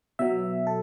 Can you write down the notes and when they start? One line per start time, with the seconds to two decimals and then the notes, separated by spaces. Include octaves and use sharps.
0.19 B2 F#3 E5
0.67 A4